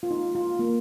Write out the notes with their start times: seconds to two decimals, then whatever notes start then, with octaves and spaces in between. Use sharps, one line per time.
0.03 F4
0.11 D#4
0.35 F4
0.59 A#3